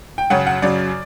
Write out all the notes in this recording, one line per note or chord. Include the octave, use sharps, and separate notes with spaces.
G5
F#2 C#3 F#3 F#5
F#5
F#2 C#3 F#3 D5